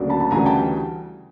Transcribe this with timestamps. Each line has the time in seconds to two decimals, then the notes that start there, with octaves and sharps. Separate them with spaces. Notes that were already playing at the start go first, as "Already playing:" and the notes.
Already playing: D2 C#3 F#3 A#3 D4
0.09 A5 B5
0.20 A5 B5
0.31 D2 C#3 E3 G3 G#5 A#5
0.46 G5 A5